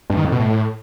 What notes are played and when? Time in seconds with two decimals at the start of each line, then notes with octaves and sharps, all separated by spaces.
0.10 G2
0.17 D#3
0.25 F2
0.32 B2
0.40 A2